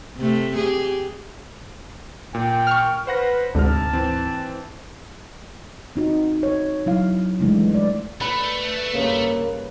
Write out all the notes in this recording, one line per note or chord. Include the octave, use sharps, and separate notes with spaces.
C3 A3
G4 G#4
A#2 G5
C#6 F6
B4 C5 F#5 A#6
D2 G#2 C3 A5 F6
E3 C4
C4 D#4 F#4
C#5
F#3 E4 F5
E3 F3 G#3 A3 D4 E4
A3 D5
A3 D4 B4
G2 C#3 A#3